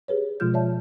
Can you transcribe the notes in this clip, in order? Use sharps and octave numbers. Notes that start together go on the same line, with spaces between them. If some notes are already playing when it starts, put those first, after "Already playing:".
G4 G#4 B4 C#5
B2 F3 G#3 F4 F6 G6
C#5 D5 E5 A5